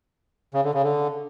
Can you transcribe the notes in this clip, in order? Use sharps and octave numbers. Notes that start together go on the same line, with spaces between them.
C#3
D3
C#3
D3